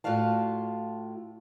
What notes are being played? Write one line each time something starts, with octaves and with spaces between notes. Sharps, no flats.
A2 F4 F#4 D5 F5 A5